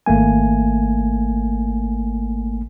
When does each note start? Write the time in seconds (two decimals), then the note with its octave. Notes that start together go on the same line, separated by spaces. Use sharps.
0.06 G#1 A3 A#3 G#5